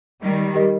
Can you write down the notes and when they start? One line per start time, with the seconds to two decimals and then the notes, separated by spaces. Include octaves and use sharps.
0.22 D#3 G3
0.55 G4 A#4 D#5